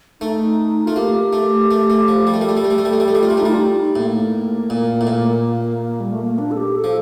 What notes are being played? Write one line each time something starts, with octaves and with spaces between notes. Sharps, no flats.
A3 D#4
A3 F4
A#3 G4
A3
A3
A3
F3
G3
A3
G3 A#4
A3 A4
G3
A3
G3
A3
G3
A3
G3
A3
G3 G4
A3 F4
G3
A3 D#4
G3 F4
D#4
A2 A#3
A#2
A2
A#2
G3
A3
A#3
D4
A4
G4
A4
F3